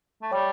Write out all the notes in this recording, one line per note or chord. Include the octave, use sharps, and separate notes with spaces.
A3
G3 C#5 G5 D6